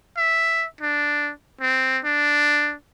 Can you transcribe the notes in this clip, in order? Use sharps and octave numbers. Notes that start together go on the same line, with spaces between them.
E5
D4
C4
D4